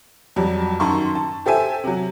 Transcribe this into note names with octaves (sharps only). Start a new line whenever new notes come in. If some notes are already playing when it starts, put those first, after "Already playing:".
F2 F#3 G3
F#2 D#3 A5 C6 C#6
A5
G4 A4 C5 E5 G#5
C3 F#3